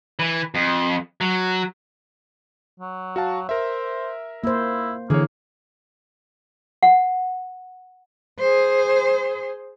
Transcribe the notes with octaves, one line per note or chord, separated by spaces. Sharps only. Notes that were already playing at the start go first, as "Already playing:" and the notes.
E3
F2
F#3
F#3
F#4 F5 A5
A#4 C5 E5
A#3 E4 C5
D3 E3 A#3 G#4 C#5
F#5
G#4 C5